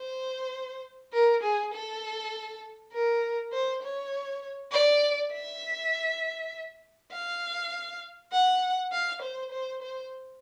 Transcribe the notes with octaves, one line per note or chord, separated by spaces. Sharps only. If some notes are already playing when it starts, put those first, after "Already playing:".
Already playing: C5
A#4
G#4
A4
A#4
C5
C#5
D5
E5
F5
F#5
F5
C5
C5
C5